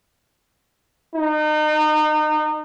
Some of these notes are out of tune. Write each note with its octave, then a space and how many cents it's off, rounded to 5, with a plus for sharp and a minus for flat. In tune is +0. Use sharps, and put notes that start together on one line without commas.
D#4 -30